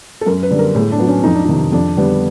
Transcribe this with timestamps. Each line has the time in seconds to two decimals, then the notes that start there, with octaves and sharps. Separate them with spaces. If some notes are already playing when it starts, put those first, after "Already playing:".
0.21 A4
0.26 F#2 A#4
0.43 B4
0.51 D3 G3
0.59 A#4
0.75 A2 G#4
0.92 D4
0.99 F#3 B3
1.08 C#4
1.24 F2 D#4
1.34 D4
1.45 D#4
1.49 C3 D#3
1.72 F2 D4
1.96 D3 G3 B3